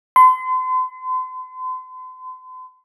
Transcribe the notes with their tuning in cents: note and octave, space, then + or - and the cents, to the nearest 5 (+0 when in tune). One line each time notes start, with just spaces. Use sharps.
C6 -40